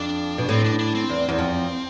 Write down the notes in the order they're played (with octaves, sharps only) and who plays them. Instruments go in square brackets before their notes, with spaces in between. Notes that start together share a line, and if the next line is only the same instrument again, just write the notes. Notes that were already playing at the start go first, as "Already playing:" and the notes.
Already playing: [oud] F2 [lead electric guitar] D4
[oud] B2
[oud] A2 [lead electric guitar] C4
[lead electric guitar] D4
D4
C4
[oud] E2
E2
F2